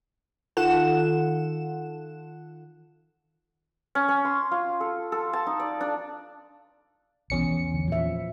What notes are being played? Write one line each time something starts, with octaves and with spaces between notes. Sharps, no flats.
D#3 F4 A4 F#5 E7
C#4
C#4
C6
F4
A4
A4
A5
D#4
D5
D4
B1 E2 C#4 C#7
E3
D3
A#2 F3 E5